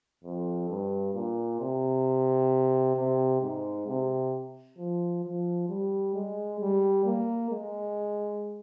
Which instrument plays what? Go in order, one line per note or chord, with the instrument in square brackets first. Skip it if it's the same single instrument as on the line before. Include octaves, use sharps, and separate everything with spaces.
[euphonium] F2
G2
A#2
C3
C3
G#2
C3
F3
F3
G3
G#3
G3
A#3
G#3